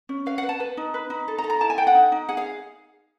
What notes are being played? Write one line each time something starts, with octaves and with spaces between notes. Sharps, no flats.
C#4
B4 F5
F#5
B4
A5
B4
D#4
B4
D#4
A4
A#5
A4
A#5
E4 A5
G#5
A4 G5
F#5
D#4
D#4
G#4 F#5
F5